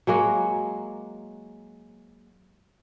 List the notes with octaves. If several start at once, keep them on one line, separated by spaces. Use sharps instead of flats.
F#3 G#3 A#3 F#4